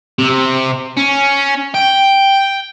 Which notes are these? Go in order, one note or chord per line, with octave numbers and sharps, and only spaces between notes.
C3
C#4
G5